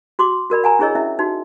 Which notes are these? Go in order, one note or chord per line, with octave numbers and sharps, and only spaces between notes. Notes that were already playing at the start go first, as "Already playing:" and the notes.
F#4 C6 D6
F#4 A#4 D5 B5
F#5 G#5 A#5
D4 E4 G#4 C#5 D#5 E6
C#4 E4 E5
D#4 F#4